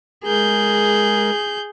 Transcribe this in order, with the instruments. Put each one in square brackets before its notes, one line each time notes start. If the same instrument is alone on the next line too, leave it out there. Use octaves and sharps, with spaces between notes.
[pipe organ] G#3 A#4 [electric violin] G#4 G6